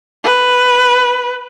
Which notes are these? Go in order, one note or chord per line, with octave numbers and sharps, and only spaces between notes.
B4